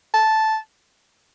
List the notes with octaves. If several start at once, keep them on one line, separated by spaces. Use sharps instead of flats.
A5